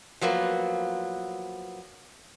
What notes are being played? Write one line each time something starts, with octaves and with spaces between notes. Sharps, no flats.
F3 F#3 A#3 B3